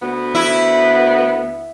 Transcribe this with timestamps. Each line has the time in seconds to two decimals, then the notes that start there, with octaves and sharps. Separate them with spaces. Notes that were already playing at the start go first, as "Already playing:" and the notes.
0.02 D2 B3
0.35 E4